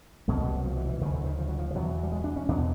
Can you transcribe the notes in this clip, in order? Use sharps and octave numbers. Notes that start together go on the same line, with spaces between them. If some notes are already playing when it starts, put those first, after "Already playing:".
C2 B2 A3
G#3
G3
F#3
F3
E3
E3
D2 C#3 D#3
D3
D#3
F3
F#3
F3
F3
E2 B2 F#3
G3
G#3
D4
C#4
E2 B2 D4